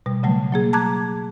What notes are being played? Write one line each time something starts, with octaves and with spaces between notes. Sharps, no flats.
B2 G3
C#3 F#3 G3 A3
F#3 A#3 G#4
A5 A#5 D6 F#6 G#6